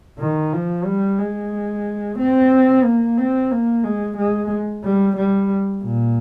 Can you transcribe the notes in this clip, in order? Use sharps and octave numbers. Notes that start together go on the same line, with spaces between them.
D#3
F3
G3
G#3
C4
A#3
C4
A#3
G#3
G#3
G3
G3
A#2